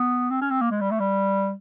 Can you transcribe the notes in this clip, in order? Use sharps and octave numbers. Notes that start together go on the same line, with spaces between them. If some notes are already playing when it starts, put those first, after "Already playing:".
Already playing: B3
C4
C#4
C4
A#3
G#3
G3
A3
G3